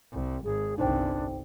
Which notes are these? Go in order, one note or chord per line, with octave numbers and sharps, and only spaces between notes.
C2
G#1 G#4
G1 C2 D4 D#4 C5 G5